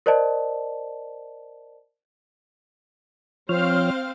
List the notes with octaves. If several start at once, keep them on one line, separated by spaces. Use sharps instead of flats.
A#4 C5 D5 D#5 A5
F3 C4 C5 C#5 F5 F6